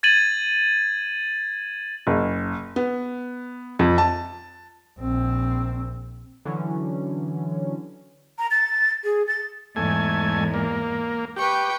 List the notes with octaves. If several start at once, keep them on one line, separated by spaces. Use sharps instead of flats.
G#6 A6 D#7 F#7
F#1
B3
F2
A5
A#1 C4
D3 E3 F#3 C#4
A#5
A6
G#4
A6
E2 G#2 A3 G#5
A#3
G4 B4 G5 C#6